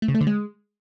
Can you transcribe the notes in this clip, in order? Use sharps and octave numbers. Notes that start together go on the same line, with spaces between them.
A3
C#3
A3
D3
G#3